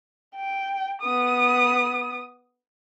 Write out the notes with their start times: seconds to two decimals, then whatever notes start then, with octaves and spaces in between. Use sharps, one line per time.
0.36 G5
1.02 B3 D#6